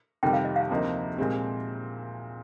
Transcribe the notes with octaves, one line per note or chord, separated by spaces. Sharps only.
F2 C3 D#3 G3 G5
F5
D#5
F5
D2 C3 F3 A#3 D#4
A#2 G#3 C4 G4